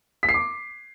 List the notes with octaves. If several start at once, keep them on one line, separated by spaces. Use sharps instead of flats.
B6
C7
D6